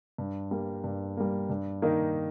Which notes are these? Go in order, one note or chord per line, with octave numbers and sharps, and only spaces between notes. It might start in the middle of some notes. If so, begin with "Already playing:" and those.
G2
G3 A#3
G2
G3 A#3
G2
D#3 A#3 D#4